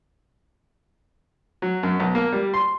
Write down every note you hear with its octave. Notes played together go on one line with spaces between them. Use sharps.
F#3
F#2
B1
A#3
G3
C6